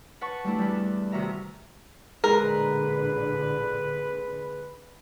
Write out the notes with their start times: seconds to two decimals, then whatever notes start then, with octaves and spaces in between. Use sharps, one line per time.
0.21 B4 F#5 A5 C#6
0.44 G3 A3 D4 E4
0.58 E2 G3
1.12 A2 C3 D#3 F#4 E5 A#5
2.24 A1 A#2 D3 G#3 A#4 B4